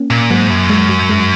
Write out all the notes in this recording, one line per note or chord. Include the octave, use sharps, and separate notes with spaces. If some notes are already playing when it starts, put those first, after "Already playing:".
Already playing: A#3 C#4
A#2
G#2 F#3 A#3
F#2
G#3
F#3
G#3